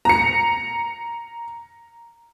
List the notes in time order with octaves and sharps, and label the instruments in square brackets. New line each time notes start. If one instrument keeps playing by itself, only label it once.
[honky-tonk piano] A#5 C#7